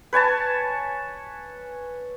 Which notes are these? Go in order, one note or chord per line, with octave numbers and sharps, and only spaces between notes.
B4 C#5 G#5 A5